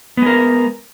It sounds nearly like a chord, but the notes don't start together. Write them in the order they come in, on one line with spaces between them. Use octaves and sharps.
B3 G#3 A#4